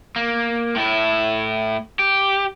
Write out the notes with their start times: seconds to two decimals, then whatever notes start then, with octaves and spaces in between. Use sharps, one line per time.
0.16 A#3
0.76 A2 E4
1.99 G4